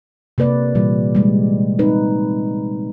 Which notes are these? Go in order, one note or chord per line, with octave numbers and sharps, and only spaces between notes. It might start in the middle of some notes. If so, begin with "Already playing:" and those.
C3 A#3 B4 D5
A#2 E3 G3
G3 G#3
C4 D#4 B4